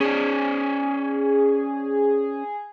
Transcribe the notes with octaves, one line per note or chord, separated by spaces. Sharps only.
C#4 G#4 C5 D5